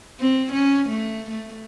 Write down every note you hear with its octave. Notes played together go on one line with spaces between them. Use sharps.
C4
C#4
A3
A3